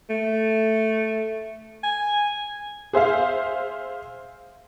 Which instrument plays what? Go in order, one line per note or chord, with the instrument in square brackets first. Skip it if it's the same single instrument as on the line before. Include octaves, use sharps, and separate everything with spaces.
[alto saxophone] A3
G#5
[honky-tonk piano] G#4 C5 E5 F5